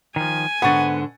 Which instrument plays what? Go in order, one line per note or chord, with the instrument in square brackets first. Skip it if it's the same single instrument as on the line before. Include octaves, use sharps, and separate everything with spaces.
[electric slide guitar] D#3 F3 [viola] G#5
[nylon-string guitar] G#2 D3 [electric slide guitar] B3 [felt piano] F#5 C#6 A6